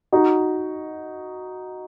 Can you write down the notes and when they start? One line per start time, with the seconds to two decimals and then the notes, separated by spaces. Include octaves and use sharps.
0.12 D#4 F#4